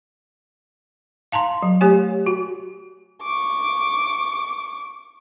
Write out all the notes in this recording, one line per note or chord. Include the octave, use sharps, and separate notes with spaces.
F5 A5 A#5 C6
F#3
A3 G4 C#5 G#5
F#4
C#6 D6